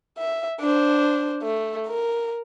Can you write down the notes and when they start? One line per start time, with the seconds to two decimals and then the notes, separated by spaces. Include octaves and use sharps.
0.18 E5
0.60 D4 C5
1.42 A3
1.87 A#4